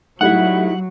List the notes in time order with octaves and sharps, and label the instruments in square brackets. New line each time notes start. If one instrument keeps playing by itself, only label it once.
[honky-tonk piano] A2 G3 A3 [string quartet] F#3 [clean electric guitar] D#4 E4 [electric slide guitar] F#5